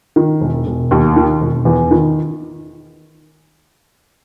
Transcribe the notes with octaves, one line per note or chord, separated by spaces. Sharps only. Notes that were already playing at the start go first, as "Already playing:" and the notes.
D#3
E1
E1
D#2
D#3
E1
E2
D#3